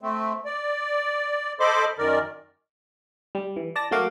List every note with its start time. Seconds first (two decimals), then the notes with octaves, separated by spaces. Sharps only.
0.01 A3 C4
0.45 D5
1.60 A4 C5 D#5 B5 C6 D6
1.98 F#2 D#3 A#4 D5
3.35 G3
3.56 E3
3.76 D5 A5 A#6
3.91 F#3 A3 A#3 F#4 F5 D6